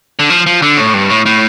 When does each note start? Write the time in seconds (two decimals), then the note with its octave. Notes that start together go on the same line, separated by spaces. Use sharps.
0.19 D3
0.30 F3
0.46 F3
0.62 D3
0.77 A2
0.94 G2
1.10 A2
1.26 A2